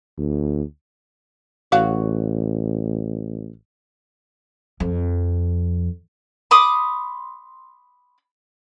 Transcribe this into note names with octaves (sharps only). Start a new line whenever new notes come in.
D2
A1 F#3 F#4 F5
F2
B5 C6 D6 D#6